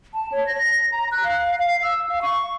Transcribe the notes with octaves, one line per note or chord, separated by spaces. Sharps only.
A5
C#5
A#6
A#5
F#6
F5
F5
E6
F5
C#6